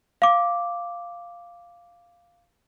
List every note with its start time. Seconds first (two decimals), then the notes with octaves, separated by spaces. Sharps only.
0.22 F5 D6